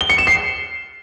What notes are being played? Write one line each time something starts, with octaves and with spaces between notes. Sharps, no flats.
G7
C#7
E7
C7